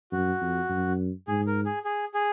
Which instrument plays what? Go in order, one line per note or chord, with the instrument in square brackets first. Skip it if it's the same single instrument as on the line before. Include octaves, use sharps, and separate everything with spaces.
[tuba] F#2 [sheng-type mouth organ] F#4
[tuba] F2
F#2
[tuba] G#2 [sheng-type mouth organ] G#4
[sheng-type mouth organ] A#4
G#4
G#4
G#4